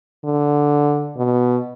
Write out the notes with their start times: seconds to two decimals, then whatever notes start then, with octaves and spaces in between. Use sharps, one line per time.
0.24 D3
1.17 B2